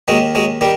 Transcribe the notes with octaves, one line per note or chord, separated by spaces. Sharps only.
D#2 D#3 F#3 G#3
F#3 G#3
D#3 G3